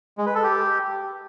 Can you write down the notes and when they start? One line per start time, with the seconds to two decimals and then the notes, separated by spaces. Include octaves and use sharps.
0.18 G#3
0.26 B4
0.35 A4
0.44 G4